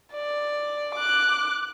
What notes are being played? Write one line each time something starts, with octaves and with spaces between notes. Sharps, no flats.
D5
D6 F#6